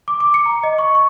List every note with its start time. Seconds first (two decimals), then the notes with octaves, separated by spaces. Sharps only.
0.08 D6
0.20 D6
0.34 C#7
0.46 A#5
0.63 D#5
0.78 C#6
0.95 C#6